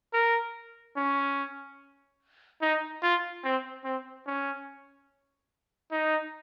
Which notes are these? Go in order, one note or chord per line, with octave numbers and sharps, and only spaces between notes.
A#4
C#4
D#4
F4
C4
C4
C#4
D#4